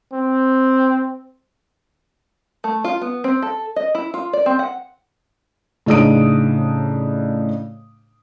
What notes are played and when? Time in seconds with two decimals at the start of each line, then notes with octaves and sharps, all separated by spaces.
0.13 C4
2.64 A3
2.84 F4
3.01 B3
3.24 C4
3.42 A4
3.76 D#5
3.95 E4
4.14 F4
4.33 D5
4.46 C4
4.59 F#5
5.86 A2 C#3 D4 D#4 D#6 D7